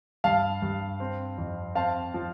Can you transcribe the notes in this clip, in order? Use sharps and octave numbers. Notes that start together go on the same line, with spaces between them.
G2 F5 A5
G2
C4
F2
C4 F5 A5
F3